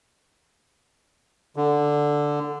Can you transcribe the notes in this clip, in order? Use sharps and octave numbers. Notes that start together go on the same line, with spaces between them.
D3